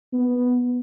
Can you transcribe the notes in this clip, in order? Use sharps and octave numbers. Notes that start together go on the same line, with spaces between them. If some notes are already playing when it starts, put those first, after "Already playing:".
B3